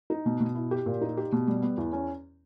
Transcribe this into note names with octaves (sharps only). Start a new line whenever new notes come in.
D#4
B2
B2
E4
G4
A#2
D#4
G4
B2
G3
B3
E2
C#4